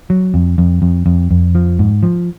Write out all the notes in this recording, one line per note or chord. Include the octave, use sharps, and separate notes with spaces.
F#3
F2
F2
F2
F2
F2
F3
G#2
F3